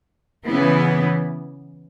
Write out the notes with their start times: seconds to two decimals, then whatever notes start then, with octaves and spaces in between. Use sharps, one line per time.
0.46 C#3 E3 B3 E4